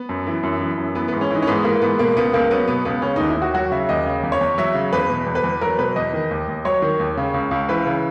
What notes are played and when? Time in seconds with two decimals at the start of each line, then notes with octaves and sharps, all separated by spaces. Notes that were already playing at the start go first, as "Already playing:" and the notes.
Already playing: B3
0.09 F#2
0.27 E3
0.43 F#2
0.61 E3
0.78 F#2
0.95 E3 B3
1.08 G#2 B3
1.21 C#4
1.31 E3 D#4
1.42 C#4
1.47 G#2 B3
1.64 E3 A#3
1.82 G#2 B3
1.99 B2 A#3
2.16 C#2 B3
2.33 C#2 A#3
2.51 F#3 B3
2.68 B2 B3
2.85 C#2 B3
3.02 C#3 C#4
3.16 D#2 D#4
3.29 E4
3.37 D#2 F#4
3.54 F#3 F#4
3.71 C#3 E5
3.89 D#2 D#5
4.06 C#3
4.23 E2
4.32 C#5
4.41 E2
4.58 F#3 E5
4.75 C#3
4.93 E2 B4
5.10 B2
5.26 E2
5.35 B4
5.44 E2
5.61 F#3 A#4
5.79 B2 B4
5.96 E2 D#5
6.14 D#3
6.31 D#2
6.48 D#2
6.65 F#3 C#5
6.82 D#3
6.99 D#2
7.17 C#3
7.34 C#2
7.51 C#2
7.69 E3 B4
7.86 C#3